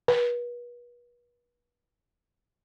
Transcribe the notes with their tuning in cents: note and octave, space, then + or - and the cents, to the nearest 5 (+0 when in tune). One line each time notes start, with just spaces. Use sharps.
B4 -40